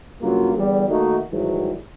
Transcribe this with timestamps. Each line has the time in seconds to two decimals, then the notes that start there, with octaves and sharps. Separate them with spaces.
0.21 G2 C#3 F#3 A#3 F4
0.56 E2 D3 G3
0.89 D#3 A3 A#3 D#4 F#4
1.32 G#2 D#3 E3 F#3 G3